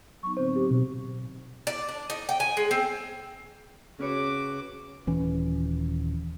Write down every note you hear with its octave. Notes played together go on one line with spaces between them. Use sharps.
F#3 B3 D#4 C#6
A2 D3 C4 C5
F#3 G4
B2
D5
D4
D#4
G5
G#5
G#3
C4
C#3 C#4 F#4 B4 C#5 D6
D#1 E3 C#4